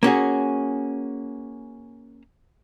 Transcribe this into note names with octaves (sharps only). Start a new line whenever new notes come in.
A#3 C#4 F#4 G#4